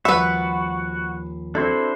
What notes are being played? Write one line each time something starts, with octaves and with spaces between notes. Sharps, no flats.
D#2 F3 G3 F#4 B4 E5 B5
C4 D4 E4 F#4 A4 C5